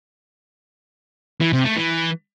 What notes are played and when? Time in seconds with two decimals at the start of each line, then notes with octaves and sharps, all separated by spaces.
1.41 E3
1.53 C3
1.65 A3
1.76 E3